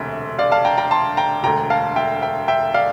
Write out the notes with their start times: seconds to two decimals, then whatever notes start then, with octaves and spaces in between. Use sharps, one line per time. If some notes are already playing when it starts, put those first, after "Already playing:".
Already playing: E1 D2 C3 E5
0.39 D5 F5
0.52 F5 A5
0.65 G5 A#5
0.77 G5 A#5
0.91 A5 C6
1.17 G5 A#5
1.43 E1 D2 D3 G5 A#5
1.70 F5 A5
1.96 E5 G5
2.22 E5 G5
2.48 E5 G5
2.74 D5 F5